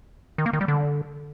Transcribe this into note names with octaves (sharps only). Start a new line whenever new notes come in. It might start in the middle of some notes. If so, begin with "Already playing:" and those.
D#3
A#3
D#3
G3
D3